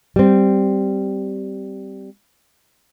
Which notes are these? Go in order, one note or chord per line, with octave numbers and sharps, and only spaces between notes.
G3 C4